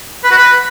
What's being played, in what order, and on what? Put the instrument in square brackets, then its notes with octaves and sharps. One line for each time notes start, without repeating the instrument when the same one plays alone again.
[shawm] B4
F#4
B4